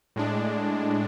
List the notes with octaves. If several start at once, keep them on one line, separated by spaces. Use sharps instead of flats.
A2 G#3 D4